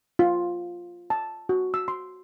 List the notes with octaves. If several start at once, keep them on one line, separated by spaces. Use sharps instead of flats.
F4
A5
F#4
E6
C6